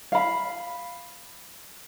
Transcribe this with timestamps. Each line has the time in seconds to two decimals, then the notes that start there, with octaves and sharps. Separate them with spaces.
0.12 F5 B5